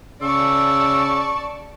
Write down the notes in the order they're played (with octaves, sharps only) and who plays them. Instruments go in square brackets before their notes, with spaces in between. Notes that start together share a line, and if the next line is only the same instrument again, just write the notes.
[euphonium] C#3 [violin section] D5 A5 [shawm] C#6 [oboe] E6